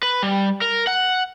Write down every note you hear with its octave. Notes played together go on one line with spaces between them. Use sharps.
B4
G3
A#4
F#5